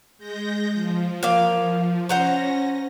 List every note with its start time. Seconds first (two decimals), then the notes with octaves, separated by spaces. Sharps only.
0.18 G#3 G6 A#6
0.74 F3
1.23 A#3 F5
2.09 C#4 C5 F#5 A#5 A#6